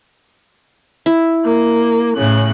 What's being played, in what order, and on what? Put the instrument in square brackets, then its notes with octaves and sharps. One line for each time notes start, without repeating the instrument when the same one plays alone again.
[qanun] E4
[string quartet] A#3
A2 C#3 F#6